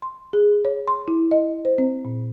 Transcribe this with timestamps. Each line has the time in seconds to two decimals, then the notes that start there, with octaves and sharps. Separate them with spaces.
0.02 C6
0.33 G#4
0.65 C#5
0.88 C6
1.08 E4
1.31 D#5
1.65 C5
1.78 C4
2.05 A#2